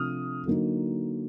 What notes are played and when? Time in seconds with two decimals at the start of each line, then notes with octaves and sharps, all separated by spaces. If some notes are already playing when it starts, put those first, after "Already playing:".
Already playing: C3 F3 A3 D4 D#6 F6
0.46 D3 F#3 A#3 D#4